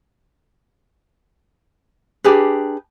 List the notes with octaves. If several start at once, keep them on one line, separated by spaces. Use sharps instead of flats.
D4 G4 G#4 B4